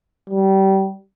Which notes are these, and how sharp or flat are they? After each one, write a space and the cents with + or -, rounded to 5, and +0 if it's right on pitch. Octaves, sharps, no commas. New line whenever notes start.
G3 -25